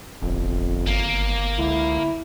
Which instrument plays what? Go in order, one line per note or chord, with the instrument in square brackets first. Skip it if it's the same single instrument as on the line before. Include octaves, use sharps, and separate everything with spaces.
[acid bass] D1 [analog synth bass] G1 [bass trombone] F2
[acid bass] G#1 [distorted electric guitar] A#3
[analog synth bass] C#2 [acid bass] D3 [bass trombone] E4